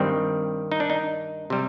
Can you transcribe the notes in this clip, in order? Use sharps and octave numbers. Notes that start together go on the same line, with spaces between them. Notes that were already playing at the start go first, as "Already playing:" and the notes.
Already playing: G2 D#3 G3 C4
D#4
D4
D#4
C3 G3